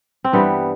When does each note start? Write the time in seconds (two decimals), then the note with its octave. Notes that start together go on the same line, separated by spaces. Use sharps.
0.24 C4
0.33 G2 E3 G3 B3